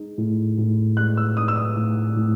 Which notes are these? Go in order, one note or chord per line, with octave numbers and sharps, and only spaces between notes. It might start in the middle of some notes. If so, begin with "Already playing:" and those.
Already playing: G#3 D#4
A2
A2
G#3 F#6
E6
D#4 D#6
E6
D#6
A2
A2